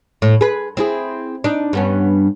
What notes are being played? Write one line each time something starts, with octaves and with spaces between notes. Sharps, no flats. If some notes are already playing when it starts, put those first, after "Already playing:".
A2
G#4 B4
C4 E4 G#4
D4 D#4
G2 B3 C#4